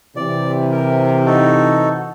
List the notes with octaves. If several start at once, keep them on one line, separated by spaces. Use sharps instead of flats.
C3 E3 D5
A#4
D#4 F#4 A4